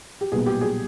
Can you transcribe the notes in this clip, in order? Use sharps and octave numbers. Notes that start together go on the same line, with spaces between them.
G4
B1 A#2 G3 B3 G#4
G4
G#4